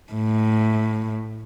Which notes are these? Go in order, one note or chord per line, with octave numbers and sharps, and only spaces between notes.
A2